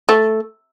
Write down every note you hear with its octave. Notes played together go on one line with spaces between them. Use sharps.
A3